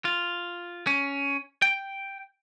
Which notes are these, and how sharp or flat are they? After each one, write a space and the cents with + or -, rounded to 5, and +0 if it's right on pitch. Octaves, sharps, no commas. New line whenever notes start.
F4 +0
C#4 +10
G5 +0